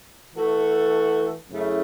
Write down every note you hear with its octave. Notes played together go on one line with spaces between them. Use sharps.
E3 A3 F#4 A4
F#2 C#3 A3 E4